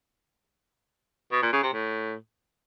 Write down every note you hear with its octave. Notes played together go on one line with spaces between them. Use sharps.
B2
A#2
C#3
C3
A2